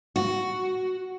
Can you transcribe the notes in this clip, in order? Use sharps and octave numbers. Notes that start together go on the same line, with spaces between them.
F#4